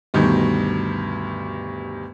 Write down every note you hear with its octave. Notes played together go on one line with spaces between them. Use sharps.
D2 G2 B2 D#3